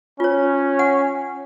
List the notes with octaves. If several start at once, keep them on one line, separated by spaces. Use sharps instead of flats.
C#4 F4 C#5
F#5